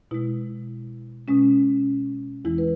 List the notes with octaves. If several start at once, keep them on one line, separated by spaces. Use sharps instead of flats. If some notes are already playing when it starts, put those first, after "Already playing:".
B2 G#3 E4
B2 G#3 C#4
E2 E3 G#3 E4
B4